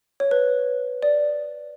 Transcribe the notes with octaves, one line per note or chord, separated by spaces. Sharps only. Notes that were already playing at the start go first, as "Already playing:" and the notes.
C#5
B4
D5